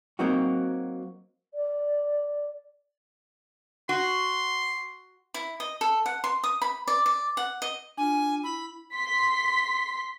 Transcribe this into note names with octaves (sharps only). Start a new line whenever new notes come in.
F#3 A#3 C4 D#4 F#4
D5
F#4 C6
E4
D#5
A4
F#5
C6
D#6
B5
D5
D5
F#5
D#5
D4 F4 G#5
E4 B5
C6 B6